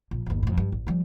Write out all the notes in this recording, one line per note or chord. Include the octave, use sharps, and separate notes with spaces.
A#1
G1 D#2
F2 A2
G2
A1
F3 G3